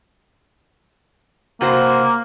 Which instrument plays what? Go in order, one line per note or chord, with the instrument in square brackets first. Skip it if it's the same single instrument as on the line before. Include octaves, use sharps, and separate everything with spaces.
[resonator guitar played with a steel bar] C3 F#4 C5 [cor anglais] A#3